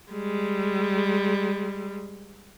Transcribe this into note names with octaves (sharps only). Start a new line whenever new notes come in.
G3 G#3